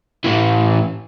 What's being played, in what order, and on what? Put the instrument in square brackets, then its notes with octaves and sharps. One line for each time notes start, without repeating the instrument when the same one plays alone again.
[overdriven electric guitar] A2 E3